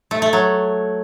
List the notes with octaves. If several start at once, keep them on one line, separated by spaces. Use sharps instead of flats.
A3
A3
F#3